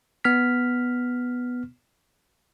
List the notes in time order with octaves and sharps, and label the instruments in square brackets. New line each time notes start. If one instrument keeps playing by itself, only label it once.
[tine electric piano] B3 F6 B6